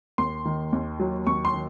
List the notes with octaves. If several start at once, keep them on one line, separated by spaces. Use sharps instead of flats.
D#2 C6
D#3
D#2
F#3
D#2 C#6
C6
D#3